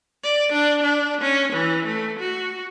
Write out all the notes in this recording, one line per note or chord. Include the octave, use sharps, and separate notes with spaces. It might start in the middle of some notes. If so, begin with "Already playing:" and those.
D5
D4
D4
C#4
E3
A3
F#4